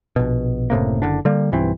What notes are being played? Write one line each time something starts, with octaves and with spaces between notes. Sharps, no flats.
A#1 B2
F#1 A2 C3 A#3
F#1 D3 D4
D3 G3 A#3
B1 G2 E3 C4